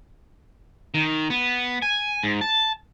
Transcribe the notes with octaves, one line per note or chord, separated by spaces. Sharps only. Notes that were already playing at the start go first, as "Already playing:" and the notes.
D#3
B3
G#5
G#2
A5